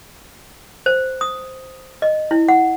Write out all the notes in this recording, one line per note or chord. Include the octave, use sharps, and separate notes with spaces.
C5
D#6
D#5
E4
F#5